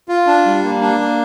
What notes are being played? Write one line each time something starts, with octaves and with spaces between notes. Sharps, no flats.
F4
D4
G3
A#3
D4
A#3